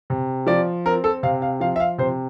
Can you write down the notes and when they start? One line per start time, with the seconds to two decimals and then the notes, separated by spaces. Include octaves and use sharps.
0.10 C3
0.47 F3 D5
0.85 C4 A#4
1.04 A4
1.23 C3 F5
1.42 F5
1.60 F3 F5
1.76 E5
1.80 F5
1.98 C3 C5